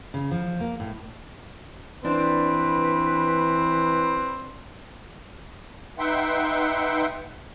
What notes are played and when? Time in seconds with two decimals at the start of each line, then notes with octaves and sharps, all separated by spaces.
0.14 C#3
0.31 F3
0.60 A#3
0.80 A2
2.05 E3 C4 D4 B4
5.99 D#4 B4 E5 F#5 G5 C6